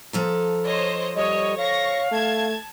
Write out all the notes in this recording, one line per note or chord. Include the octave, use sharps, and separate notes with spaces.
F3 A4 A#5
C5 C#5 D#5
G3 C#5 D#5
C#5 F5 C#6 A#6
A3 A5 G#6